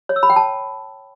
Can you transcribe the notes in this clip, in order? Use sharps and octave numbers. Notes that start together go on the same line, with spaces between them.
C#5
E6
B5
G5
A5